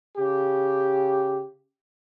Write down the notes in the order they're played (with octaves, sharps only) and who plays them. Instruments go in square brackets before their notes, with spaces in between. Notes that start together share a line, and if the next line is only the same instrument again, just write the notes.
[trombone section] C#3 G4